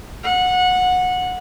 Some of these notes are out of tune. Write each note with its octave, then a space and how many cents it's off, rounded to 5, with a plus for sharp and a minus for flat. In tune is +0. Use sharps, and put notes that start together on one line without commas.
F#5 -20